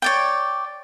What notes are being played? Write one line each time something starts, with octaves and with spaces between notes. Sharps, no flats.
C#5 D5 G5